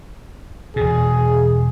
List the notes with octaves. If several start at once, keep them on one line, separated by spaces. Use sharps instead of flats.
E1 B2 G#4